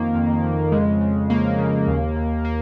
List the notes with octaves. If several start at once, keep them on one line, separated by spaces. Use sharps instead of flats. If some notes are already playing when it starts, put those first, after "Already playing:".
Already playing: F2 D#3 A#3
F2
F2
C#3 G#3
C#3
C#3 A#3
C#3
D#2
D#2
A#3